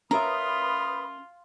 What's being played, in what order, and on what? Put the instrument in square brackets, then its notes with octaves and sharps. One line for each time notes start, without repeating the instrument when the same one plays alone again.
[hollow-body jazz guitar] C#4 A#4 E5 [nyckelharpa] F4 [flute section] B4 B5 D#6 [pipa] A#5